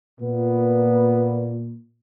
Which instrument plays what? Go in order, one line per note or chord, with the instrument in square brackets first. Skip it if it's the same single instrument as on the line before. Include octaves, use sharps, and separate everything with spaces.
[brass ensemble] A#2 [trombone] B3